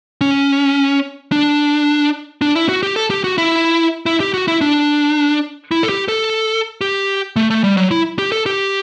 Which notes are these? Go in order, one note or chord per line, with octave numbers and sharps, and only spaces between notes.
C#4
D4
D4
E4
F#4
G4
A4
G4
F#4
E4
E4
G4
F#4
E4
D4
E4
A4
G4
A4
G4
A3
A3
G3
F#3
E4
G4
A4
G4